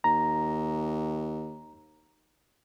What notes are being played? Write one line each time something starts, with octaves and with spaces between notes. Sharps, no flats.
D#2 A#5